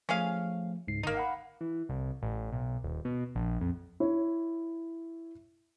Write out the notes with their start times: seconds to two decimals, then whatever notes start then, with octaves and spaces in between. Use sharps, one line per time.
0.09 F3 A3 C#4 G#4 F5
0.88 C#2 G#2 C7
1.03 G1 A#3 D#4
1.15 F5 F#5 B5
1.61 E3
1.89 C2
2.22 A1
2.52 B1
2.84 D#1
3.05 B2
3.35 A#1
3.61 F2
4.00 E4 C#5